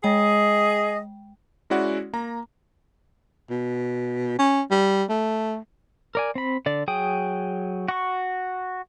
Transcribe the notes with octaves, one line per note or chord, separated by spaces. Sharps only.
G#3 G#4 D#5 G5
G#3 C#4 E4 F#4 D5 F#5
A#3 A#5
B2
C#4
G3
A3
A#4 D5 G#5
C4 B5
D3 D5
F#3 G#4 G5 D#6
F#4 C#6